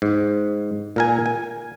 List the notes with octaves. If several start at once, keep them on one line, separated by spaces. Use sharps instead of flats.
G#2
A#2 A#4 G#5
G#5